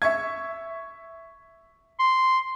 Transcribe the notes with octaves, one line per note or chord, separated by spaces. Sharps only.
E5 C#6 G#6
C6